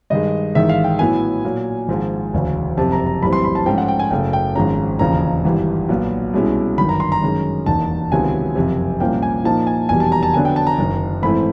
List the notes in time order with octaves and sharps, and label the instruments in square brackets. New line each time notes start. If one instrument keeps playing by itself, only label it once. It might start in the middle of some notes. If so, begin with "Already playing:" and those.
[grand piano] G2 D#3 G#3 D#5
A1 G#2 D#3 G#3 E5
F5
G5
A2 F#3 B3 E4 G#5
A#2 F#3 A#3
G#1 G#2 F3 G#3
E1 D2 C#3 F#3
F#1 F2 C3 A5
A#5
A#5
B1 A2 E3 G3 C4 B5
C6
B5
A5
G#2 F3 A3 C#4 G5
F#5
G5
G#5
F#1 F#2 C#3 F#3 A3 G5
G5
G#1 G#2 F3 G#3 C#4 A#5
E1 D#2 C#3 F3 A#5
G#1 G2 E3 G3
B1 A#2 F#3 B3
C2 B2 G#3 C#4 E4
G1 F#2 D#3 B5
A#5
C6
A#5
F#2 D#3 G#3 C#4
E1 D#2 D#3 A5
C#2 C3 D#3 F#3 B3 G#5
F#1 F2 C3
C2 A#2 F3 A#3 C#4 G5
G#5
A#2 F3 A#3 D#4 A5
G#5
F1 E2 B2 G3 G#5
A5
A#5
A5
F2 D3 F#3 B3 D4 G#5
G5
A5
A#5
F#1 F#2 D#3
G#2 E3 A3 C4 E4 B5